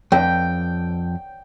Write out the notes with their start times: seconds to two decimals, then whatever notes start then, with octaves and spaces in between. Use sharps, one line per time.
0.12 F2 G5